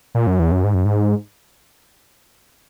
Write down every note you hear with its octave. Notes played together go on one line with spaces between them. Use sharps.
A#2
F#2
E2
F#2
G#2
F#2
G#2